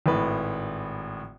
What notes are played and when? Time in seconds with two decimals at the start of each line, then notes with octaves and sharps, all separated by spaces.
0.06 G#1 A2 B4